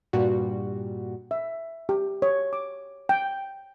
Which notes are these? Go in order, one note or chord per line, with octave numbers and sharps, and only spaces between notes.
G2 A#2 G3 F#4
E5
G4
C#5
D6
G5